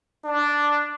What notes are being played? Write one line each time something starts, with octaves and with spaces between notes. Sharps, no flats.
D4